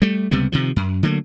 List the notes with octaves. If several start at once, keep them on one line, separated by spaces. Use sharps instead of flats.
G3 A3
C#2 C3 G3 B3
C3 D#3 F3
F#2
D3 F#3 A3 A#3